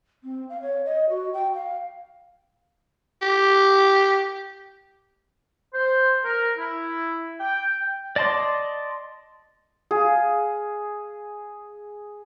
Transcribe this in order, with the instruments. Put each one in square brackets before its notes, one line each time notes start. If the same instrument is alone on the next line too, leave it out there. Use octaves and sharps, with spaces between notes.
[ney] C4
F5
C#5
D#5
F#4
G5
F5
[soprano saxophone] G4
[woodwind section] C5
A#4
E4
G5
[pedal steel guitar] D5 D#5 A5 C6 D6
[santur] G#4 [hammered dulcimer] F5